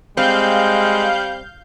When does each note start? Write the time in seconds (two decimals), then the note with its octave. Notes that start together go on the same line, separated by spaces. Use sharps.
0.17 G3 G#3 C4 F5 G6